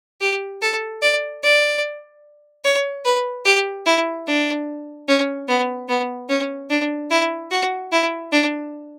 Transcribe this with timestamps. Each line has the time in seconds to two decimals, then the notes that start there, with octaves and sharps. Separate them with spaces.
0.21 G4
0.62 A4
1.02 D5
1.43 D5
2.64 C#5
3.05 B4
3.45 G4
3.86 E4
4.27 D4
5.08 C#4
5.48 B3
5.89 B3
6.29 C#4
6.70 D4
7.10 E4
7.51 F#4
7.92 E4
8.32 D4